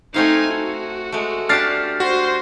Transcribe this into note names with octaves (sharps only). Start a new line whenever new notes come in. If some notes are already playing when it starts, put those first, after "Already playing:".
A3 C4 D#4 F5 G#5
F#4
G#3 A3
D4 G4 A5 F6 A6 C7
F#4 C5 C6